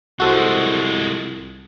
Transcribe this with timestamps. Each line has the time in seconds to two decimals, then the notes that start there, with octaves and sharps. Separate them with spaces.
0.20 C2 F3 G#3 F#4 A4 C5